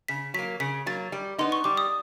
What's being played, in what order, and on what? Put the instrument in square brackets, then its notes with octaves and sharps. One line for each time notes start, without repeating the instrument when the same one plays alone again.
[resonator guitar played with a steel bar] C#3 [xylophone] B6
[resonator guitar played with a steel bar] F#3 A#3 [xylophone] B6
[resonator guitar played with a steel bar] C#3 [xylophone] B6
[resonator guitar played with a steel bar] F#3 A#3 [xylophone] A6
[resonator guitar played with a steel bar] G3
[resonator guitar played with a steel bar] B3 D#4 [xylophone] C6
[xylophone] C#6
[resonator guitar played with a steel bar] G3 [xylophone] D6
[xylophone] D#6